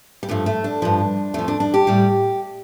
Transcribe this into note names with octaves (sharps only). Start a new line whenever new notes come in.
G3
G2 F3 A3
A3
D4
G2 F3
F2 F3 A3
D4
D4
G4
A2 G3